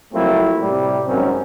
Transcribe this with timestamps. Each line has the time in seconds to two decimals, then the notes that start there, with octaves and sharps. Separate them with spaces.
0.14 F3 F#3 A3 A#3 C4 E4
0.61 A2 C3 G3
1.08 G#1 F#2 F#3 C4 C#4 A#4